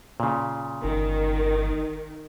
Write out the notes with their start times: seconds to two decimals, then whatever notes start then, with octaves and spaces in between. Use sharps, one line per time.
0.20 A#2 C#3
0.84 G1 D#3